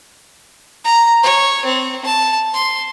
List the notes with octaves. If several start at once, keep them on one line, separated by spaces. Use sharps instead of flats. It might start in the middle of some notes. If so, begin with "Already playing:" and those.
A#5
C#5
C4
A5
C6